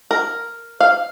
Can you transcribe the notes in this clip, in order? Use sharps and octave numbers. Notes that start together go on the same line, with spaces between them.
A#4
F5